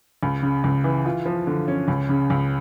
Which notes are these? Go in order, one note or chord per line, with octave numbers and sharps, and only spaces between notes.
C#2
C#3
C#2
E3
F4
F3
D3
C#4
C#2
C#3
C#2